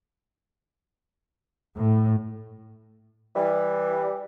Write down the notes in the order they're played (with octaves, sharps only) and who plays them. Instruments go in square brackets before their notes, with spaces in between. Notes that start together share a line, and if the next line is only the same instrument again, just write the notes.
[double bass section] A2
[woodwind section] E3 G3